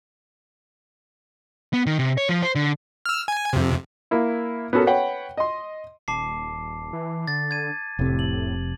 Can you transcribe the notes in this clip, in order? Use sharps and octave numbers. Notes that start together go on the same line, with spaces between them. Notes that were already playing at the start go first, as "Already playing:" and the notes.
B3
D#3
C3
C#5
F3
C5
D3
E6 F6
G#5
F2 C3
A#3 E4
B3 C#4 F#4 A4 A#4
B4 C#5 F#5 G5
D#5 C6
D#1 A5 D6 C7
E3
D3 A6
G#6 D#7
F1 A2 C3
F#7